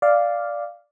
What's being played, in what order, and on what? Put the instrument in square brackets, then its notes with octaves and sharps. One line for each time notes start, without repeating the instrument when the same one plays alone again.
[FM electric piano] D5 F5